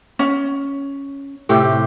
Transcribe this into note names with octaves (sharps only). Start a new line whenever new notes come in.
C#4
A2 C3 G4